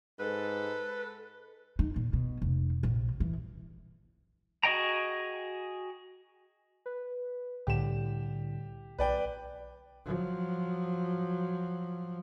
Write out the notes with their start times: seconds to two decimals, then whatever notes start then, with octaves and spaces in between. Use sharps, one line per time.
0.20 G#2 A4 B4
1.79 D#4
1.96 A#2
2.13 B2
2.42 F1
2.83 A#1
3.20 E3
4.63 F#4 G#4 D#5 G5 A#5
6.86 B4
7.67 C2 A2 D3 G4 E7
8.98 B1 B4 D5 G5
10.05 F3 F#3